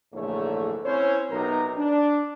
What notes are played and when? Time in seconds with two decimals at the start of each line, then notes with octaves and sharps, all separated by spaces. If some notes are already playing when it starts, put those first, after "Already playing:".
0.13 A#1 G#2 D3 E3 A3 C#5
0.85 C4 C#4 E4 C5 C#5
1.31 B1 C3 D#4 A#4 B4 A#5
1.77 D4